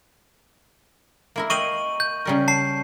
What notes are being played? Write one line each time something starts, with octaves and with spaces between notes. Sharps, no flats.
A#3 E4 A#4
D#5 F5 G5 C#6 D#7 F#7
G6
C#3 G3 A#4
A5 C7